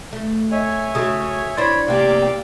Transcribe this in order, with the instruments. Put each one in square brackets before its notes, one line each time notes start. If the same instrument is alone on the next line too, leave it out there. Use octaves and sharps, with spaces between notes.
[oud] A3
[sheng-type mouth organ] C#5 E5 G#5 [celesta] D#5
[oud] C#3 A3 [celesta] F#4 D#6
[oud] D4 E4 C5 [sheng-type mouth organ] C#5 B5 [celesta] C6 G#6 A6
[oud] C3 A#3 [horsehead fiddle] G4 D5 [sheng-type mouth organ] F5 E6